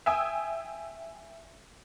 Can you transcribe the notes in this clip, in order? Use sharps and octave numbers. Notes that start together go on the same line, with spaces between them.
E5 G5 G#5 D#6 E6